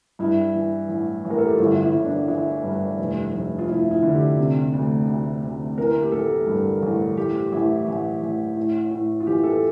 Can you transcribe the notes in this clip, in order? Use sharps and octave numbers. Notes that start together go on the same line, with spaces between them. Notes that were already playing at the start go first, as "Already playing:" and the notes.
G2 E4
E3
A1
A1
A#4
A4
G4
F4
G1 E4
E4
G1
D4
E3 E4
G2
F1
F1
F4
F1 E4
E4
D3
G4
C3
D2
D2
D2
E3 A#4
G4
A1 A4
G2
A1
A1 G4
A1 E4
A1
A1
A2
A2
F4
E3 G4
A4